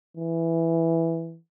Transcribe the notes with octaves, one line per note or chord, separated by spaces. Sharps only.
E3